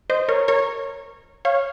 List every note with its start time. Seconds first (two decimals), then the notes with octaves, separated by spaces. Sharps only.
0.10 C5 D#5
0.29 A#4 C#5
0.48 A#4 C#5
1.45 C#5 F5